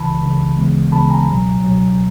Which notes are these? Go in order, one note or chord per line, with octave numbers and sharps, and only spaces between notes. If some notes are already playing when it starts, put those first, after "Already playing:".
Already playing: C#2 C#3 E3 A5 B5
C#2 C#3 E3
D2 C#3 E3 G#3 B3
D2 C#3 E3 G#3 B3 A5 B5
G#5 A#5
C#2 B2 F#3
C#2 B2 F#3